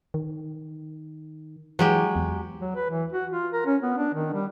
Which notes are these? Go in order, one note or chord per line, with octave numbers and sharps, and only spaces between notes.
D#3
E3 F#3 G#3 G4
E2
F#3
B4
E3
F#4
F4
A#4
C#4
B3
D4
D#3
G3